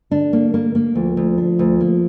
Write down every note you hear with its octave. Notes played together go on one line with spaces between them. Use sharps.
D3 D4
A#3
A#3
A#3
D2 F3
D2
D4
D2
A#3